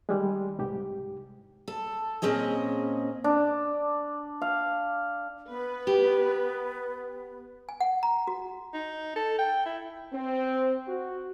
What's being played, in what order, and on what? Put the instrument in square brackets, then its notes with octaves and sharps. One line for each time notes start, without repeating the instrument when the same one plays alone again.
[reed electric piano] D#3 G3 G#3
C2 G#2 G4
[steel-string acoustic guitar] A4
A#2 C4 C#4 G#4 D#5
[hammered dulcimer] D4
F5
[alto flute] B3 [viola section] B4
[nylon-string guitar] G4
[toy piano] G#5
F#5
A#5
F#4
[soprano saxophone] D#4
A4
G5
E4
[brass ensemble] C4
F#4